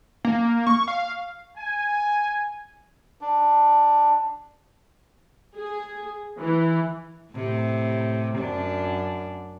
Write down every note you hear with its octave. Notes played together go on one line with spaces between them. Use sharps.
A#3
C#6
F5
G#5
D4
G#4
E3
A2 C3
F#2 D4